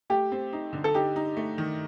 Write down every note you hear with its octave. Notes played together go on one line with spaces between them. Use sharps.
A3 G4
C4
D#4
D3
A4
D#4 G4
D#4
A3
D#3